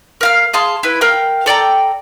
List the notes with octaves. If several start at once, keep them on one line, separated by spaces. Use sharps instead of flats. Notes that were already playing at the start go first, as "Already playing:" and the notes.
A#4 F5 F6
G#4 F5 A5 C6
E4 B4
A#4 F5 G5
A4 D5 G5 A#5